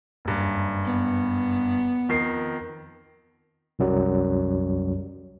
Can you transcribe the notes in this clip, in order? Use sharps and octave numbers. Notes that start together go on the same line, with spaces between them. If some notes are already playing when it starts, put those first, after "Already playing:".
F#1 G2
B3
F2 D#3 C7
C2 F#2 F#3 G3